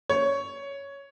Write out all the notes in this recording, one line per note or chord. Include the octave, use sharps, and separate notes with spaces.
C#5